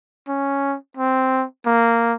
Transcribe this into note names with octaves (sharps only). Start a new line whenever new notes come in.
C#4
C4
A#3